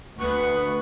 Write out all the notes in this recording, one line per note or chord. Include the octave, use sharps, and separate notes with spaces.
D2 B3 B4 F#5 C#6